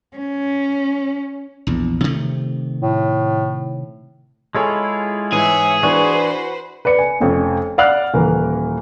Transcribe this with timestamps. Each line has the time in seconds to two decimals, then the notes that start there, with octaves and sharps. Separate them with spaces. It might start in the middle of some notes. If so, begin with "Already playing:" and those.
0.17 C#4
1.67 A#1 E2
2.04 C3 D#3 A3
2.82 A2
4.55 G#3 E4 F4 G#4 A4 C#5
5.32 G#2 E3 G#4 C#5 E5
5.83 E3 D4 F#4 B4 C5
6.85 B4 D5 C#7
6.99 G#5
7.20 F1 F2 C#4
7.78 D5 F5 F#5 F6 F#6
8.14 D#1 E3 A#4